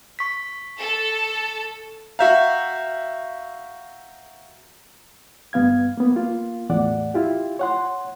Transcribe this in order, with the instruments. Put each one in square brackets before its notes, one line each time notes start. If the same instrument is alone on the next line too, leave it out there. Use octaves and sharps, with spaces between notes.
[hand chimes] C#6 B6
[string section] A4
[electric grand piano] F#4 E5 F5 [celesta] A#5 G6
[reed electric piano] G2 B3 F5 G#6
A#3 B3
A#3 F4
E2 A2 D5 F#5
E4 F4 G4
C#5 F#5 C6